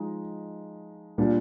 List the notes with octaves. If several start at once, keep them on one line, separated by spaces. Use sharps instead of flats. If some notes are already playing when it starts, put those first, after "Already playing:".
Already playing: F3 G#3 D#4
A#2 G3 D4 F4